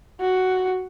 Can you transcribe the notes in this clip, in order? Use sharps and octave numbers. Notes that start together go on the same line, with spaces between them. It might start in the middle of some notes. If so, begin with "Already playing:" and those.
F#4